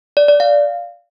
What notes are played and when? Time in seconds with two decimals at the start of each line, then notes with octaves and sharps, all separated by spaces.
0.17 D5
0.28 D5
0.40 F5